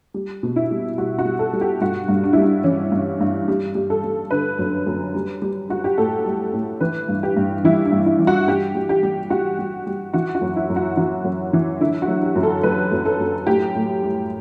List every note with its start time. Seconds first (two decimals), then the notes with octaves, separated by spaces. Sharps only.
0.14 G3
0.43 B2
0.56 E4
0.71 G3
0.98 G3 F#4
1.19 F#4
1.25 G3
1.39 A4
1.53 G3
1.61 G4
1.81 G2 F#4
2.08 G2
2.24 D4
2.33 G3 E4
2.42 D4
2.64 E3 C#4
2.92 G2
3.21 G2
3.48 G3
3.75 G3
3.90 A4
4.04 G3
4.31 D3 B4
4.59 F#2
4.87 F#2
5.15 G3
5.42 G3
5.69 G3 F#4
5.84 G4
5.98 A2 A4
6.26 G3
6.54 A2
6.80 E3 B4
7.08 G2
7.23 G4
7.37 G2
7.64 E3 E4
7.85 D4
7.92 G2
8.06 E4
8.19 E3
8.27 F#4
8.48 G3 G4
8.75 G3
8.89 G4
9.03 G3
9.30 G3 F#4
9.59 G3
9.87 G3
10.13 E3 F#4
10.35 F#4
10.41 F#2
10.56 E4
10.70 F#2
10.76 F#4
10.97 E3 F#4
11.25 F#2
11.53 E3
11.81 D3 E4
12.02 F#4
12.08 F#3
12.23 G4
12.36 F#2
12.43 A4
12.63 F#3 B4
12.92 F#2
13.05 A4
13.20 F#2
13.47 A2 G4
13.75 A2
14.03 G3